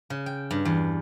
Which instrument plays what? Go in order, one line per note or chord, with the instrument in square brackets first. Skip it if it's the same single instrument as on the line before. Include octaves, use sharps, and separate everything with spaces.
[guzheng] C#3
G5
G2
E2